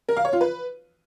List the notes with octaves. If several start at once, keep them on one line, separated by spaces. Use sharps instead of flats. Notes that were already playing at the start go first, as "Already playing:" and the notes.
A#4
F5
C#5
F4
B4